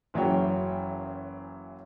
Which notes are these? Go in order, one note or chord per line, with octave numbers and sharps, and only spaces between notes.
F#1 E3 F#3 C#5 G5